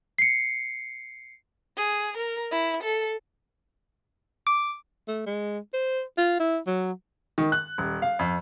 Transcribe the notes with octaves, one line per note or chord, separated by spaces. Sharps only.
C7 C#7
G#4
A#4
E4
A4
D6
A3
G#3
C5
F4
E4
F#3
D#3
F#6
D#1
F5
F2